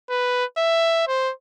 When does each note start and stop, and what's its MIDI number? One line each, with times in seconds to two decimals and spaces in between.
0.10 0.45 71
0.58 1.07 76
1.08 1.32 72